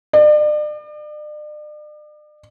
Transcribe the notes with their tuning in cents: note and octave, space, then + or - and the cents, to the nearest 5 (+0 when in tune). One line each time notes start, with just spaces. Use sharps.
D5 +40